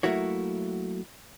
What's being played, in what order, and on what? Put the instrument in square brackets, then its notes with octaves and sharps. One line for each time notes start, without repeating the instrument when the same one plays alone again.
[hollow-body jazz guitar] F#3 A3 A#3 E4 F#4 C#5